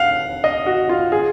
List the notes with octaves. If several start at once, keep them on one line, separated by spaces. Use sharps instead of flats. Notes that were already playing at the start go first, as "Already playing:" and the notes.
Already playing: F5 F#5
D#5
F#4
F4
G#4